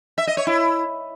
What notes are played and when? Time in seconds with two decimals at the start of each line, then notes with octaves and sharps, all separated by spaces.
0.18 E5
0.27 D#5
0.37 C#5
0.47 E4